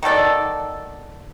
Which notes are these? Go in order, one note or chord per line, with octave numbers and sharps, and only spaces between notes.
D#3 F#4 A4 D5